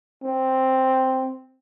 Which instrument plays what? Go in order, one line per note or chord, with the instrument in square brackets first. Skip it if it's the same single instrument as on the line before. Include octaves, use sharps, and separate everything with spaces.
[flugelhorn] C4